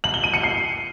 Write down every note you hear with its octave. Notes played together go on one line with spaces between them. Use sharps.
F#7
G7
D#7
C#7
C7